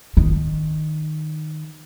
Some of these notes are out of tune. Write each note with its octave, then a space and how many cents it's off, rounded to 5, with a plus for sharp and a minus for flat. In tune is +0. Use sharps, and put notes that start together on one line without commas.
D#3 -10